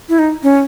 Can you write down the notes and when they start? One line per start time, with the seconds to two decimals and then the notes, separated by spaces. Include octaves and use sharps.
0.09 E4
0.19 D#4
0.43 C#4